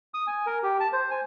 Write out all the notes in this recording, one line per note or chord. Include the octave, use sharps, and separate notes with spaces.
D#6
G#5
A#4
G4
A5
C5
G#5